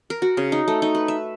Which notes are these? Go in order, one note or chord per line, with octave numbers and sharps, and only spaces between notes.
A#4
F#4
C#3
D#4
A3
D#4
B4
E5